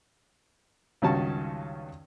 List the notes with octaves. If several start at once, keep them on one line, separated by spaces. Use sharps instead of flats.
C#2 G2 D#3 C#4 F#4 A5